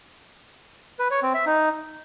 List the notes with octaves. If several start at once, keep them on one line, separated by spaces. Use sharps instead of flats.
B4
C#5
C4
E5
D#4